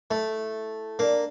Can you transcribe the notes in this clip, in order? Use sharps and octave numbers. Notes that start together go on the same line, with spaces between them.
A3 E4
A#3 D4